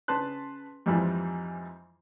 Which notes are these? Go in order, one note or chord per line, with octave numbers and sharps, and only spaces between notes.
C#3 B4 A5 C6 F#6
F2 G#2 E3 F3 G3